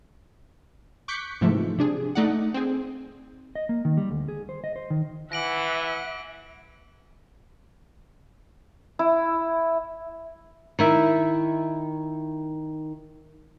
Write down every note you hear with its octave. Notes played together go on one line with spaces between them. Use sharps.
C#6 D6 F#6 G6 B6 C#7
G#2 C3 E3 F3 A3
C3 D4 G#4
A3 D#4 D5 F#5
C4 G#4
D#5
A#3
D#3
G3
D2
G#4
C5
D#5
C5
D#3
E3 E5 F#5 A#6 D7 F#7
E4
D#3 E4 E5